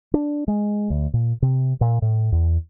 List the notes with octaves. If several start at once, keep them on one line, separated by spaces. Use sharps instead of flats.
D4
G#3
D2
A#2
C3
A#2
A2
E2